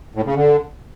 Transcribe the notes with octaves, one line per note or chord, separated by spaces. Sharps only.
A2
C#3
D3